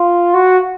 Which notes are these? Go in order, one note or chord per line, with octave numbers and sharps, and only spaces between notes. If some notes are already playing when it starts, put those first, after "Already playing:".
Already playing: F4
F#4